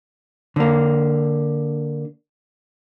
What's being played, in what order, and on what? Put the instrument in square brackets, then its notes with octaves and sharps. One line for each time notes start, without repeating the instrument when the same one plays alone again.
[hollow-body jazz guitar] D3 A#3